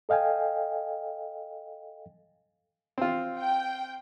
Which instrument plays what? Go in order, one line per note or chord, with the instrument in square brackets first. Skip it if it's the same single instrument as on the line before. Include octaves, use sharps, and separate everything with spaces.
[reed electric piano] A4 D#5 F5 G5 G#5
[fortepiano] C4 F4
[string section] G5